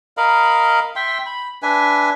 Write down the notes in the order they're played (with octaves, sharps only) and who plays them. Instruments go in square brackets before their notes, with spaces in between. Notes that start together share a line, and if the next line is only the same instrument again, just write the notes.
[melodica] A#4 D#5 F5 B5
E5 G5 C6
B5
D4 B4 E5 G#5